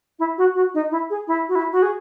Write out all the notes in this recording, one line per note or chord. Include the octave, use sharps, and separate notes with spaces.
E4
F#4
F#4
D#4
E4
G#4
E4
F#4
E4
F#4
G#4